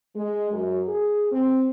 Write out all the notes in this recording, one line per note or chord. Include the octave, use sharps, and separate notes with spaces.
G#3
F#2
G#4
C4